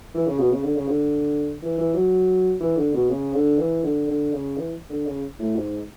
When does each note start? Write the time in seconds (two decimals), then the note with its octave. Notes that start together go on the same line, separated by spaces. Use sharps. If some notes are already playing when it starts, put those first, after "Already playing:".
0.15 E3
0.27 C#3
0.39 B2
0.51 C#3
0.64 D3
0.76 C#3
0.88 D3
1.62 E3
1.78 E3
1.94 F#3
2.60 E3
2.77 D3
2.94 B2
3.10 C#3
3.34 D3
3.59 E3
3.83 D3
4.08 D3
4.33 C#3
4.57 E3
4.90 D3
5.06 C#3
5.39 A2
5.56 G#2